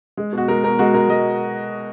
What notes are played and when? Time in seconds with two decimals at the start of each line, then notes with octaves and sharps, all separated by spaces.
0.17 G#3
0.33 B2 F#4
0.48 G#3 A#4
0.64 B2 A#4
0.79 G#3 F#4
0.94 G#3 A#4
1.09 G#3 D#5